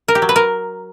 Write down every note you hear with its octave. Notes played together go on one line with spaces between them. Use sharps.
A#4
G4
F#3
B4
A#4